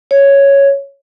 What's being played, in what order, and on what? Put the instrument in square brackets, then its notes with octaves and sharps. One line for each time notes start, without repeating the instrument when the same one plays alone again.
[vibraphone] C#5